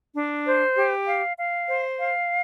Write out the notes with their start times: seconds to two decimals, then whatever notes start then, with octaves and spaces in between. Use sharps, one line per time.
0.16 D4
0.46 C5
0.76 G4
1.07 F5
1.37 F5
1.68 C5
1.99 F5